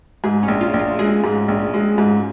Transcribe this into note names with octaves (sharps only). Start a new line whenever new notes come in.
G#2 G#4
C#4
A#1
F4
A#1
F4
G#3 G#4
G#2
A#1
G#3
G#2